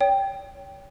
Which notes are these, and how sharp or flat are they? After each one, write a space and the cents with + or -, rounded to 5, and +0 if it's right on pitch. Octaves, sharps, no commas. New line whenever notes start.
C#5 +30 G5 +0